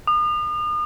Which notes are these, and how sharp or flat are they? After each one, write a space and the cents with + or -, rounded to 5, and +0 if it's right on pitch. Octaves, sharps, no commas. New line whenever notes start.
D#6 -40